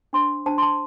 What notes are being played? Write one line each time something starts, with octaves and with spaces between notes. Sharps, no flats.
D4 C5 C6
D4 C5 A5
C6
A5